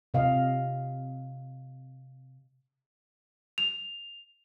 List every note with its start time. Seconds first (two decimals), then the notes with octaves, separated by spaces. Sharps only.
0.14 C3 D#5 F5
3.58 F7